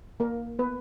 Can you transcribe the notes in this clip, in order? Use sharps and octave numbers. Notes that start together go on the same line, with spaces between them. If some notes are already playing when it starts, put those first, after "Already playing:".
A#3 A#4
B3 B4